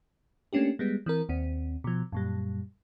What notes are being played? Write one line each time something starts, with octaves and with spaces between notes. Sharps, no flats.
A3 A#3 C#4 D4 G4
G3 G#3 B3
E3 C4 A#4
D#2 C4
B2 F3
F#2 A#2 G3